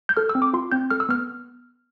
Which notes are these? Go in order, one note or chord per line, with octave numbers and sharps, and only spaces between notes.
G6
A4 F6
E6
C4
D6
F4 C6
C4 G6
A4 F6
E6
B3 F6